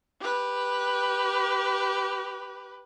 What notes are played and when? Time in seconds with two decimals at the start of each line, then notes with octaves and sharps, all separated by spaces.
0.20 G4 B4